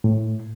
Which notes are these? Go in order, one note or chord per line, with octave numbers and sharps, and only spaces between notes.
A2